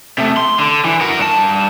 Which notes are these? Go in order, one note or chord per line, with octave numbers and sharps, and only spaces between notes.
C3 A3
C6
D3
E3
F#4 A#4
G2 A5